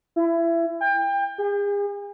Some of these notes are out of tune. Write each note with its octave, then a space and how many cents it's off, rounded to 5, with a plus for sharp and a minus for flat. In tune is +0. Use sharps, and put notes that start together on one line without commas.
E4 +25
G5 +30
G#4 -40